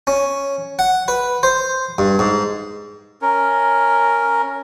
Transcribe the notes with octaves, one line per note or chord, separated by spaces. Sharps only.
C#4
F#5
B4
C5
G2
G#2
C#4 A#4